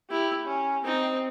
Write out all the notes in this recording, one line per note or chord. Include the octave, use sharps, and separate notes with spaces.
E4 G4
C#4
C4 D#4